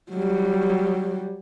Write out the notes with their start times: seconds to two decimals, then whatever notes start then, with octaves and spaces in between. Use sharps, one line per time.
0.12 F#3 G3